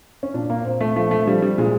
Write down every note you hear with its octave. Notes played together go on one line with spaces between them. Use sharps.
C#4
A#2 D4
A#3
A#2 C4
A3
F3 A3
A3
F3 G3
G3
A#2 G#3